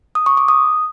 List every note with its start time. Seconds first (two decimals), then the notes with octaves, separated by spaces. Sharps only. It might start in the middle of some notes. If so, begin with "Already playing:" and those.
0.15 D#6
0.26 C#6
0.37 D6
0.48 D#6